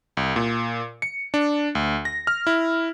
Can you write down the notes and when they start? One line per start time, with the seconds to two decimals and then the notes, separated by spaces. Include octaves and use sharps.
0.17 C2
0.36 A#2
1.02 C#7
1.34 D4
1.75 D2
2.05 A#6
2.27 F6
2.47 E4